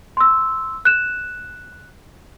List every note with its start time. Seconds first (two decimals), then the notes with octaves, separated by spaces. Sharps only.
0.17 C6 E6
0.85 F#6 E7